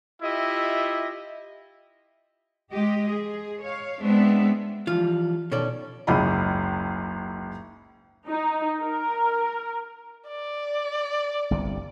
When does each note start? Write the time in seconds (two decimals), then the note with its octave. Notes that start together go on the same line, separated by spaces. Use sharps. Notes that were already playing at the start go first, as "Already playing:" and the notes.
0.22 E4 F4 G4 D#5 E5
2.71 G#3 G4 D#5
3.09 G#4
3.62 C#5 F5
4.01 G#3 B3 C4 D4 E5
4.87 E3 F3 G3 F4
5.52 B2 D#3 C#4 A4 D5
6.07 F#1 C#2 G#2 D#5 B5
8.28 D#4
8.81 A#4
10.29 D5
11.51 G1 C2 C3